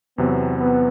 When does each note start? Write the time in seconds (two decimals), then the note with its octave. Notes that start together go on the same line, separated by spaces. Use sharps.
0.18 E2 C3 F#3 B3 C4
0.59 B3